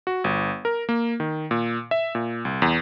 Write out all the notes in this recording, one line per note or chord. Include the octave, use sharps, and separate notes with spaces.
F#4
G1
A#4
A#3
D#3
A#2
E5
A#2
C2
E2